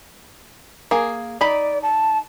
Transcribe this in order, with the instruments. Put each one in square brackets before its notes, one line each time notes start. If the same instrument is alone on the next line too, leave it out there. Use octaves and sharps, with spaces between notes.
[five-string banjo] A#3 G#4
[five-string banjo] D#4 B5 [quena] D5
[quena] A5